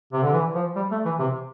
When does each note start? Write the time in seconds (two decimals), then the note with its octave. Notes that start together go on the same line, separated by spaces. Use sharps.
0.12 C3
0.22 D3
0.33 E3
0.55 F3
0.76 G3
0.91 A3
1.05 E3
1.19 C3